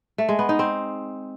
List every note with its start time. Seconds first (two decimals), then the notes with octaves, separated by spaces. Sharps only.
0.18 A3
0.29 G#3
0.39 B3
0.49 D#4
0.59 C4